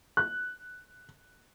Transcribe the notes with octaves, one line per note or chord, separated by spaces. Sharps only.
F#6